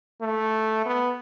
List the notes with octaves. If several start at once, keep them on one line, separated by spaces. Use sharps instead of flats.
A3
B3